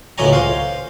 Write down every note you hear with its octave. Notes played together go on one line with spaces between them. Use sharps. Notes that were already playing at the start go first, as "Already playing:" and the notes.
C#2 A2 F#3 C#5 G#5 A#5
C5 F5